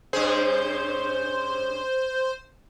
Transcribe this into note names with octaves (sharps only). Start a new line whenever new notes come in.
G2 C#4 G#4 C5